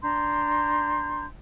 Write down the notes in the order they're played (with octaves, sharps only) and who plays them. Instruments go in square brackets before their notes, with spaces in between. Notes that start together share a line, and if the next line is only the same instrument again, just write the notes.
[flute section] D4 A#5 C6 G6